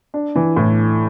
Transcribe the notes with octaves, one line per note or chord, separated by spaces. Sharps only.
D4
E3
A2